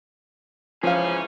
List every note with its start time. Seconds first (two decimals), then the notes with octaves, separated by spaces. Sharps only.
0.83 G#2 C#3 E3 F3 C#4 G#4 F5